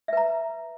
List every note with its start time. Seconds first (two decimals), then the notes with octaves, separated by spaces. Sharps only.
0.08 E5
0.13 B4
0.17 A#5